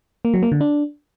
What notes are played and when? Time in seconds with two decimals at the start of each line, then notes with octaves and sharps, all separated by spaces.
0.25 A#3
0.34 F#3
0.43 A#3
0.52 D3
0.61 D4